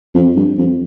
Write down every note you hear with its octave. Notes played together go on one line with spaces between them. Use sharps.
F2
G2
F2